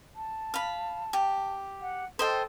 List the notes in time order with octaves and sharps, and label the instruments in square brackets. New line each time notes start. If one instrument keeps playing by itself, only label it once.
[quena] A5
[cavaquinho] F5 B5
G4
[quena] F#5
[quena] A4 [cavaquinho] C5 D#5 G5